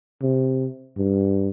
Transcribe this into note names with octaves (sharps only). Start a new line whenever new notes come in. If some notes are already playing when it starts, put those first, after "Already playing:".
C3
G2